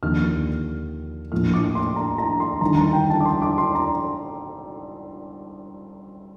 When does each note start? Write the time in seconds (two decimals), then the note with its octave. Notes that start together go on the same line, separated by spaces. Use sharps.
0.03 D#2 D3 F3 A#3 F6
1.32 A#1 A2 F3 A#3 F6
1.54 D6
1.75 C6
1.96 A#5
2.18 A#5
2.40 C6
2.61 G1 G2 D#3 A#5
2.77 A#5
2.93 G5
3.10 A5
3.20 D6
3.25 C6
3.42 D6
3.58 C6
3.75 A#5